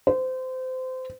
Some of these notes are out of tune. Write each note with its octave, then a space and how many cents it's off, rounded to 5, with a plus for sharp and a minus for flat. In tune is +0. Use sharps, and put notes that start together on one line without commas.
C5 -25